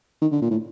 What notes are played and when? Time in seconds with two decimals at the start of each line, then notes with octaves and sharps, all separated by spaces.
0.21 D#3
0.32 D3
0.41 A#2
0.51 A2